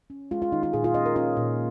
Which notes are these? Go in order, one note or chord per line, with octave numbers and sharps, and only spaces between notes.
C#4
G#3 F4
F4
D#3 D#4
F4
A#2 G#4
F4
C#4 D#5
A#4
C#4 F4
A#2